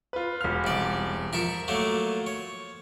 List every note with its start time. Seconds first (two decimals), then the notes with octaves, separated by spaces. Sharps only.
0.13 F4 B4
0.41 E1 F6
0.64 C2 D5
1.33 F3 A#4 E5 C#6
1.68 F#3 A3 A#3
2.27 C#5